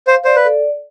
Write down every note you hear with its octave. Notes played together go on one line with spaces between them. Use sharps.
C5 F5
C5 D5
B4
A4